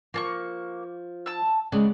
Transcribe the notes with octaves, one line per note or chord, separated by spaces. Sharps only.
F3 A#3 A5 C#6
A5 E6
C#3 G#3 D5 F#5